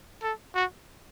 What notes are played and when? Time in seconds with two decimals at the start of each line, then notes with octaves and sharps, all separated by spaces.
0.23 A4
0.55 F#4